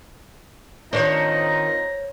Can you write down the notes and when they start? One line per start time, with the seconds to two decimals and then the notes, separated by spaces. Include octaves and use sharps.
0.93 D#3 C4 D4 D#4 F4 C5 C#5 A#5